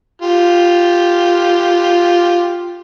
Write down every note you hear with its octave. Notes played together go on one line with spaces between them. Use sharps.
F4 G4